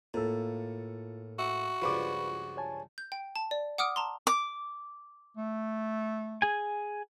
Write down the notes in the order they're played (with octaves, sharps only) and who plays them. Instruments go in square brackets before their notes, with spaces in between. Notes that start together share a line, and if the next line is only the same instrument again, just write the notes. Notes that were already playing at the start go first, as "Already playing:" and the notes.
[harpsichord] A2 [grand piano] A#3 A4 [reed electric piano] F4
[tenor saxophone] F#4 [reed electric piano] E5
[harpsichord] C#2 G2 F3 [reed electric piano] F4 B4 B5 [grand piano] C#6 D6
[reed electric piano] C#5 G#5 A5
[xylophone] G6
G5
A5
D5
F#5 D6 D#6 F6 D7
A5 A#5 C6
[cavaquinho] D6
[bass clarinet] A3
[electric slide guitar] G#4 G#5